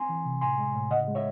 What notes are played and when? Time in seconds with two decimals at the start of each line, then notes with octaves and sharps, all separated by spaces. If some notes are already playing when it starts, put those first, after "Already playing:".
Already playing: C4 G#5 C6
0.09 E3
0.25 C3
0.41 A2 G#5 C6
0.58 G#3
0.75 A2
0.91 C#3 D#5 F#5
1.08 G#3
1.15 C#5 E5